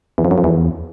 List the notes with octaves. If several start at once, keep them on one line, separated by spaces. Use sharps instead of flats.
E2
F2
F#2
F2
E2